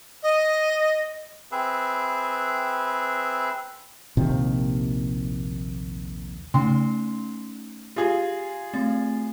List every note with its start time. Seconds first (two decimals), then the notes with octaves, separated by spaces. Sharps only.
0.23 D#5
1.52 C4 G#4 B4 E5
4.17 A#1 D#2 C3 D#3
6.54 C#3 A3 C#4 D#4 C6
7.96 F4 G4 G#4 F5
8.74 A3 C4 A6